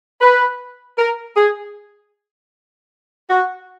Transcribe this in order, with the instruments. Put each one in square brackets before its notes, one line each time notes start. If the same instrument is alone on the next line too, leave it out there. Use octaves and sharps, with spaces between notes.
[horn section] B4
A#4
G#4
F#4